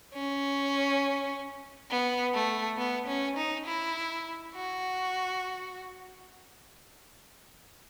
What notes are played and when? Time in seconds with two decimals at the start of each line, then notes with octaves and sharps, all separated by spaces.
0.14 C#4
1.90 B3
2.34 A3
2.77 B3
3.07 C#4
3.36 D#4
3.66 E4
4.55 F#4